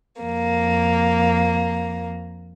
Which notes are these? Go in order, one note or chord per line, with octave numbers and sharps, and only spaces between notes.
F2 A#3